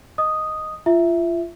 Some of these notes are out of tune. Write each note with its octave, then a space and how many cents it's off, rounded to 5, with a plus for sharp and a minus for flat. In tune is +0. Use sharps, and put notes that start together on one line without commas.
D#5 +0 D#6 +0
F4 -25 E5 +0